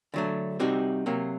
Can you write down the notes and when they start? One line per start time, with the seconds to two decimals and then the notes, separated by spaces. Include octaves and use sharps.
0.14 D3 F#3 A3
0.60 C3 G3 C4 D#4 F#4
1.06 C3 F#3 A#3